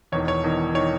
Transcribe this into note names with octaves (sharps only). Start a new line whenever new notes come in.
E1 E2 D#3 C#5
C#5
E1 E2 D#3
D#3 C#5